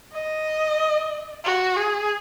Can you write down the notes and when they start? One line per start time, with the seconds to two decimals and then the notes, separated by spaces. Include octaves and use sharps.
0.13 D#5
1.45 F#4
1.77 G#4